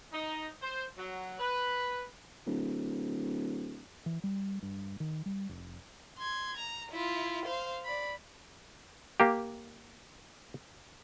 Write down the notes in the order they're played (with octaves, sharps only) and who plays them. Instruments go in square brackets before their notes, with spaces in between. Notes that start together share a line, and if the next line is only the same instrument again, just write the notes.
[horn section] D#4
C5
F#3
B4
[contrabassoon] D1
[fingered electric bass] E3
G3
G2
D#3
G3
F1
[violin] C6 G#6
A#5
E4 F4
C5 F5
D5 B5
[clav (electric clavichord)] A#3 G4